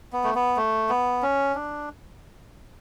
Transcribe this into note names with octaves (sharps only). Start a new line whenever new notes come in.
B3
A3
B3
A3
B3
C#4
D4